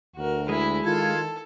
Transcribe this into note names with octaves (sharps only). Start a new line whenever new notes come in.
D2 F#4 A#4
G#3 E4
D#3 F4 A4 G#6